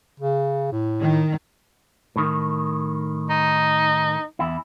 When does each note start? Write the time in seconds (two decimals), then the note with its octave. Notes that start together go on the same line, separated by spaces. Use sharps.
0.20 C#3
0.72 A2
1.01 D#3
2.16 A2 D#3
3.29 D#4
4.39 E2 E4